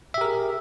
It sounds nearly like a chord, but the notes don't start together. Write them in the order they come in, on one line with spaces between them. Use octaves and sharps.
E5 G4 A#4 G#4